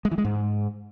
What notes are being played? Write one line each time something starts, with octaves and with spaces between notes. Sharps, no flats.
G#3
E3
G#3
G#2